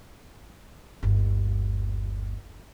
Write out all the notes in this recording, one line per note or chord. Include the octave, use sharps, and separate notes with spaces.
G1 D#2